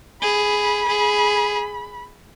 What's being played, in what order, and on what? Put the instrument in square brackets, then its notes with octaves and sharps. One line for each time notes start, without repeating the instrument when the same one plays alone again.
[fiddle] G#4 [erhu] B5
[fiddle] G#4